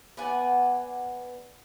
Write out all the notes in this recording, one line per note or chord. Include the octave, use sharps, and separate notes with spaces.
B3 D5 F#5 G#5